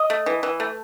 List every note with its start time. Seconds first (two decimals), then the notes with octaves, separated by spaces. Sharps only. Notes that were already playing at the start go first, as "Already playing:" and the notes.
Already playing: D#5
0.10 A3
0.26 E3
0.43 E3
0.60 A3